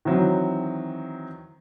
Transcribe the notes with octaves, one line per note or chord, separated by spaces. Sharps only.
D#3 E3 F#3 C4